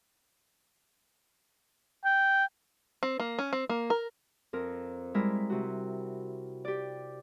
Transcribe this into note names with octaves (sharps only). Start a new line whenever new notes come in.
G5
C4
A#3
C#4
C4
A#3
A#4
F2 A#4
G3 G#3 E4 A#4
C3 F#4
G4 D5